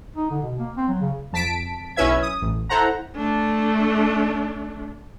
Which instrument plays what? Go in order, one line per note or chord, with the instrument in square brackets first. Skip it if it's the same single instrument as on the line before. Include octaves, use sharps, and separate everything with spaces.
[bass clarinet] D#4
D3
B2
A#3
C4
F#3
C#3
[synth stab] F2 A5 B6 D7
B1 C#4 E4 B4 E5 G#6
D#6
A1
E4 A4 C5 F#5 A#5
[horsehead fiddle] A3 D4